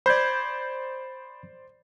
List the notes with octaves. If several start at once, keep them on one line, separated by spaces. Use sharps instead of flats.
C5 D5 B5 G6 G#6